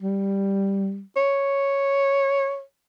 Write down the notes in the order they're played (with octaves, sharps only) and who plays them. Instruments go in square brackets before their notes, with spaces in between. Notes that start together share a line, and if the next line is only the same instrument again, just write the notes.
[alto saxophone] G3
C#5